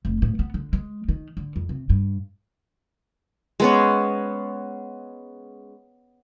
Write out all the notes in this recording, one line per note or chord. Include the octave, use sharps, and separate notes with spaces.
F1
A2
B3
D3
G#3
D#3
D3
F2
C3
G2
G#3 B3 C#4